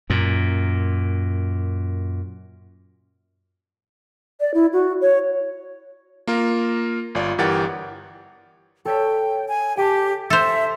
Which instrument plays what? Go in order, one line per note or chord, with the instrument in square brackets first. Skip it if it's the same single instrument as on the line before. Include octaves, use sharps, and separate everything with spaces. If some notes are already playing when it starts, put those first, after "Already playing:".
[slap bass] F#2 A#2
[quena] D5
E4
F#4
C#5
[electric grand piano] A#3 F4 A#4
G1 F4 D5
G1 E3 G4 A#4 F#5 A6
[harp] A4 C#5 B6 [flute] G5
[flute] G#5
[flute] G4 [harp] G5 A5 D6
[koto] A4 C5 [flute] E5